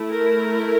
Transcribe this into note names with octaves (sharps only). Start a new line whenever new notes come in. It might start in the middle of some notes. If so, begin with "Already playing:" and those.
Already playing: A3 E4
A#4